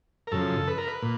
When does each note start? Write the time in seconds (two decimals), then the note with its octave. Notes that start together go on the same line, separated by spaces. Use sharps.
0.27 A#4
0.31 F#2 C#3 F3 A4
0.68 B4
0.78 A#4
0.88 B4
1.02 A#2